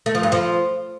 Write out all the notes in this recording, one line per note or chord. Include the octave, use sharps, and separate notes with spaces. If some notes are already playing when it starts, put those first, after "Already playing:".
A3
F3
G2
F3